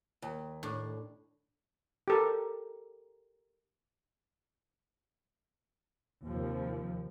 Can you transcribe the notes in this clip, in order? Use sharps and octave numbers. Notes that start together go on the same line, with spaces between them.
D#2
A2 D4
G4 A4 A#4
D#2 C3 F3